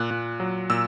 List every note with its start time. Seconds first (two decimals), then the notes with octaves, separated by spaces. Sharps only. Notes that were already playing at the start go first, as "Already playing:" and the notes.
Already playing: A#2 F#6
0.11 A#2
0.40 F#3
0.70 A#2 E6